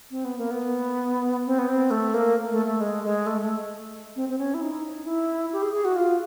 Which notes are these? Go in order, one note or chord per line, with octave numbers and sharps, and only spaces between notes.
C4
B3
A#3
B3
C4
B3
C4
A3
A#3
A3
A3
G#3
G#3
A3
A3
C4
C4
C#4
E4
D#4
E4
G4
G#4
G#4
F#4
F4